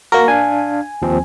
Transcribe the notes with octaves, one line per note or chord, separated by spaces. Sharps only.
A#3 F#4 A#4 A#6
D4 F5 G#5
D#2 F3 C4